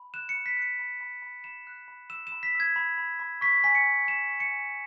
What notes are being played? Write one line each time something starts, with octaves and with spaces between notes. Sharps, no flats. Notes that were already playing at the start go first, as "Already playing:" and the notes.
Already playing: B5
F#6 E7
C#7
B5
B6
F#6 C#7
B5
B5
B5
B5 E7
F#6
B5
E6 E7
E7
B5
B6
E6
G#6
B5
B5
B5
C#6 B6
G#5 B6
C#7
G#5
C#6 E7
C#6
C#7
G#5